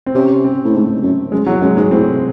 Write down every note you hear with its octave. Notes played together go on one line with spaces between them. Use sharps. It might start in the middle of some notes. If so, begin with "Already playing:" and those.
C4
C3 C#4
C4
A2
G#2 A3
F#2
F#2 G#3
E2 F#3
F#2 G#3
G#2 G#3
A2 C4